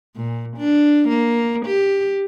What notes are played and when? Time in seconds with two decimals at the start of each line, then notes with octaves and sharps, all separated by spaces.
0.16 A#2
0.57 D4
1.09 A#3
1.66 G4